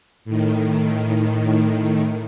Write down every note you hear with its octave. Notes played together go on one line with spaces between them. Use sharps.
A2 D#3